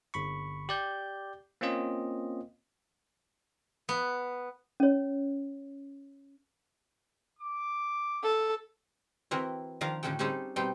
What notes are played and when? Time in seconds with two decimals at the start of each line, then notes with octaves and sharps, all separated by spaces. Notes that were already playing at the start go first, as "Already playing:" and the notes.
0.14 G1 B5 C#6
0.69 G4 D5 G6
1.61 A#3 C4 C#4 F4 D#5
3.89 B3
4.80 C#4 C#5
7.39 D6
8.23 A4
9.31 E3 C4 E4 F#4 A#4
9.81 D#3 F3 D4 A#4 F5 A#5
10.03 A2 D3 C#4 F#4 A4 G5
10.19 G3 C4 C#4 D#4 G#4 A4
10.56 B2 G3 C4 D#4 G5